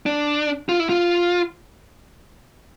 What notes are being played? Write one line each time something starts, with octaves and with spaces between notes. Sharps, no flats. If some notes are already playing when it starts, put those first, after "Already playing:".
D4
F4
E4
F4